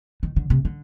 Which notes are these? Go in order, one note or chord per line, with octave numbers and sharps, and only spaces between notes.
D#3
D3
C3
D3